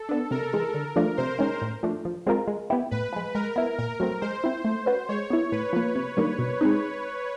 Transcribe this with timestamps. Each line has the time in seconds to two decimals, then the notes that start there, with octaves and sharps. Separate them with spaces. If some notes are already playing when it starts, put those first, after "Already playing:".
Already playing: A4
0.09 B3 D4
0.31 C3 A#4
0.53 E3 G#3
0.74 D3
0.96 F3 A3 D4 F4
1.17 C3 C5
1.39 D#3 G#3 C#4
1.61 A2
1.83 F3 A3 D4
2.05 F3
2.27 G#3 C4 F4 A#4
2.48 G#3
2.70 B3 E4 G4
2.91 A2 B4
3.13 F3 G#3
3.34 G#3 A#4
3.56 B3 E4
3.78 A#2 A#4
4.00 F#3 A3 C4
4.21 G#3 C5
4.44 C4 E4
4.64 A3
4.86 C#4 F#4 B4
5.09 G#3 C#5
5.30 B3 E4
5.52 A2 B4
5.73 F3 A#3
5.95 C3
6.17 D#3 G3 A#3 D4
6.39 B2
6.61 G#3 C4 D#4